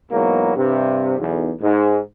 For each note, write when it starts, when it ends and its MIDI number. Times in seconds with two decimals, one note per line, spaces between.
0.11 0.53 40
0.11 0.53 44
0.11 0.53 47
0.11 0.53 54
0.11 0.53 58
0.56 1.13 43
0.56 1.13 48
1.18 1.52 35
1.18 1.52 40
1.61 1.98 44